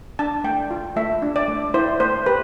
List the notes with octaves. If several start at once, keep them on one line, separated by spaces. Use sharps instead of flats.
D4 A5
A3 G5
F4
A3 E5
D4
D5
A3
E4 C5
A3 C5
G4 B4